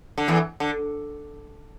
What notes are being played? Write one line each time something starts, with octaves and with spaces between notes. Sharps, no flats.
D3
E2 E3
D3